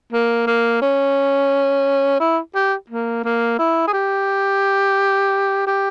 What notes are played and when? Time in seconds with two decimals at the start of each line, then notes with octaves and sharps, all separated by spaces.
0.12 A#3
0.47 A#3
0.82 C#4
2.20 E4
2.55 G4
2.90 A#3
3.24 A#3
3.59 E4
3.88 G#4
3.93 G4
5.67 G4